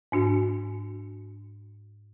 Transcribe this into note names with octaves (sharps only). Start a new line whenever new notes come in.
G#2 D4 F#4